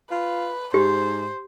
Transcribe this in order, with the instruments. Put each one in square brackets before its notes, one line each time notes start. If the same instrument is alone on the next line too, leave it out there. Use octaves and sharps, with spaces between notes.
[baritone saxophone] F4 [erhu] B4
[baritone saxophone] G#2 [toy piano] G4 [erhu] C5